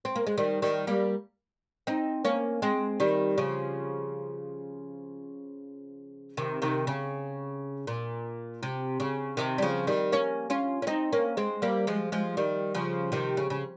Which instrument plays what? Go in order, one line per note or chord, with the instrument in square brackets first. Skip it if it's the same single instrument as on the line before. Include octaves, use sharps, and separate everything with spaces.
[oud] C4
A#3
G#3
D#3 G3
D#3 G3
G3 A#3
C4 D#4
A#3 C#4
G#3 C4
D#3 G3
C#3 F3
C3 D#3
C3 D#3
C#3
A#2
C3
C#3
C3 D#3
G3
C#3 F3
D#3 G3
A#3 C#4
C#4 F4
C#4
C4 D#4
A#3 C#4
G#3 C4
G3 A#3
F3 G#3
F3 G#3
D#3 G3
C#3 F3
C3 D#3
C#3
C#3